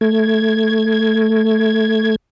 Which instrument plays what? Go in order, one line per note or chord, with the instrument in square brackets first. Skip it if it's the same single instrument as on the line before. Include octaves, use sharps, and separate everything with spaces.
[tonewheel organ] A3 G#6